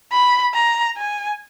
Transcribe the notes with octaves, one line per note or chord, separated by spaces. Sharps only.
B5
A#5
G#5